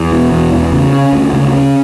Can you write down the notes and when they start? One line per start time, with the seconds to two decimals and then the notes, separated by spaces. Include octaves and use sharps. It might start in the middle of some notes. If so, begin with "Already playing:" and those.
Already playing: E2
0.12 B2
0.31 E2
0.53 E2
0.72 C#3
0.93 C#4
1.13 D2
1.33 C#3
1.54 C#4